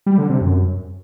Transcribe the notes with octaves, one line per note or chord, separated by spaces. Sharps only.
G3
D3
C3
F#2